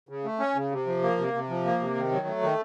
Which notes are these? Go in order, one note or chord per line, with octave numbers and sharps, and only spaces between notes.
C#3
A3
C#4
C#3
C3
F3
A#3
C3
C3
F3
A#3
C3
D#3
F#3
A3
D#3